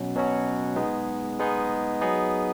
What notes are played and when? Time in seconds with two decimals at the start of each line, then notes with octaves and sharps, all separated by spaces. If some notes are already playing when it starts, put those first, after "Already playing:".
Already playing: B2 F#3 C#4 F#4
0.15 B2 F#3 C#4 F#4
0.76 G#3 B3 D#4 G#4
1.39 G#3 B3 D#4 G#4
2.01 F#3 B3 D#4 G#4 D#5